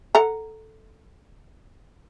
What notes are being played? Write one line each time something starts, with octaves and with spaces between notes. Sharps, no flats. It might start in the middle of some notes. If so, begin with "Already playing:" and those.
A4 F#5 A#5